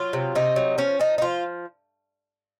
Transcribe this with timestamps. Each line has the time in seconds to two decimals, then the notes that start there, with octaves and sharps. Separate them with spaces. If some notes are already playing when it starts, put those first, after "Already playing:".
Already playing: F#3 F4
0.13 C3
0.35 C3 D#4
0.56 F#3
0.78 F3 C#4
0.99 F3 D#4
1.18 D#4
1.22 F3 F4